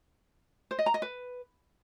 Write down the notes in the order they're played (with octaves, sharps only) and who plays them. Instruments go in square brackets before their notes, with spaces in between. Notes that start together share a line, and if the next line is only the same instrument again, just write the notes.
[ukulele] C5
D#5
A#5
D#5
B4